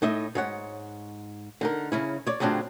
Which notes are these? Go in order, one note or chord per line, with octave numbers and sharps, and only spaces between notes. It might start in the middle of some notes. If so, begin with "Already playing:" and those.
A2 D#4 D#5 E5
G#2 C#5 F#5
D3 D#4 A#4
C#3 C#4 E4
C#5 D5
A2 C#3 F#3 C4 D4 F4